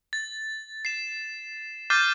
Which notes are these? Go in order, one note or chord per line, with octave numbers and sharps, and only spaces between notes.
A6
C7 E7
D6 F6 G6 A6 C7 D#7